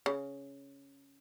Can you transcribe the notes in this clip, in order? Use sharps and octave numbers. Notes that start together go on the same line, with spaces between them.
C#3